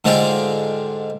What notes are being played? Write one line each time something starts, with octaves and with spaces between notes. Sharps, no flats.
G#2 D3 G#3 F4 G4